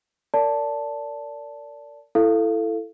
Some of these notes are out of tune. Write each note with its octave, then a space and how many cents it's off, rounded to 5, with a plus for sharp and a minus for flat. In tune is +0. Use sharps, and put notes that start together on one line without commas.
A#4 -30 D5 -20 A5 +0
E4 +15 A4 +5 F5 -20